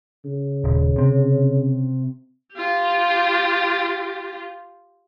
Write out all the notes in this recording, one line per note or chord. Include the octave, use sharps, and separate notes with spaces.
C#3
D#1
C3 C4
F4 G4